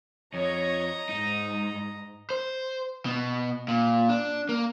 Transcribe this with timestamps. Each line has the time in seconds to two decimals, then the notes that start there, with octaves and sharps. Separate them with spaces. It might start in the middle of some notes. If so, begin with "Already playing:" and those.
0.34 F2 C#5 D#5 A#5
1.09 G#2 D#4
2.30 C5
3.06 B2
3.68 A#2
4.09 D4
4.49 A#3